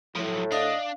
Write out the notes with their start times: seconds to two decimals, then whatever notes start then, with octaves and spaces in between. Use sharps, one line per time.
0.16 A2 F3 F#3
0.52 D4 D#5 F5